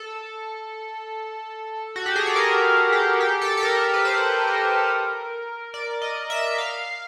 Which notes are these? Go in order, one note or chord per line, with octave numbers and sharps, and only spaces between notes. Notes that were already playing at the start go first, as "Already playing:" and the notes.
Already playing: A4
F#4
G4
G#4
A4
A#4
G4
G4
A4
A4
A#4
B4
C5
A#4
D5
D#5
E5
F5